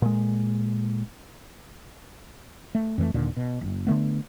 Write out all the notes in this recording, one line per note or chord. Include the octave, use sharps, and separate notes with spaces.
A#2 G#3
A3
F2 E3 G3 A3
D#1 D#2 A#2 D3
B2
F#1
D3 D#3 A3 B3